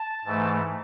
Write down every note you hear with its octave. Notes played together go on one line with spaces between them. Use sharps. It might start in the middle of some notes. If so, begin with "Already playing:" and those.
Already playing: A5
G#2 E3 A3